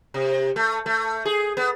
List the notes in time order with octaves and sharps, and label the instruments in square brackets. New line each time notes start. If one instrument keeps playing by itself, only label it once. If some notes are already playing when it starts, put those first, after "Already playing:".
[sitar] C3
A3
A3
G#4
B3